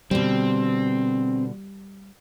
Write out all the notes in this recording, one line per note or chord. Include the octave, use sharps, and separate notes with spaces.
B2 D3 G3 C4